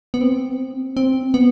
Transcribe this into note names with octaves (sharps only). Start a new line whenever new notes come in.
B3
C4
C4
B3